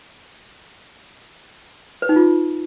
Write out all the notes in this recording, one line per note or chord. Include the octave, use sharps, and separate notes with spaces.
B4
D#4
F4